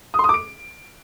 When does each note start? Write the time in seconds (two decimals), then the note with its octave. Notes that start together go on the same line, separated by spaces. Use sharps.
0.14 D#6
0.19 C6
0.24 D#6
0.29 D6
0.34 D7